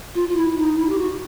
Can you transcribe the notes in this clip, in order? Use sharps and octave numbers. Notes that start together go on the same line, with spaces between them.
F4
F4
E4
E4
D#4
E4
G4
F#4